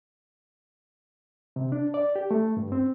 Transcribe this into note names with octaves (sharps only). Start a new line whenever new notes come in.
C3
D4
D5
G4
A3
G2
C4